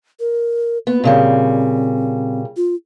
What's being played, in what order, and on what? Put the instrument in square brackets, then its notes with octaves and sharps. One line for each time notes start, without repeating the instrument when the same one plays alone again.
[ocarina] A#4
[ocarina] A#3 [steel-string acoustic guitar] B3
[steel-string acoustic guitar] A#2 C#3 G3 [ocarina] C4
[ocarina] F4